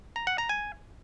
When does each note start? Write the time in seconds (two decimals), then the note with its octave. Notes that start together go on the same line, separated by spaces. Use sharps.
0.16 A#5
0.27 F#5
0.38 A#5
0.49 G#5